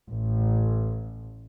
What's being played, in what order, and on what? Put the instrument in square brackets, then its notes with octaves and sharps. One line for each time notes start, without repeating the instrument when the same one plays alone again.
[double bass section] A1